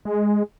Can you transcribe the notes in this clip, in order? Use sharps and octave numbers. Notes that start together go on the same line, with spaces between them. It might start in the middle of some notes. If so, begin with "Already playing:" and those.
G#3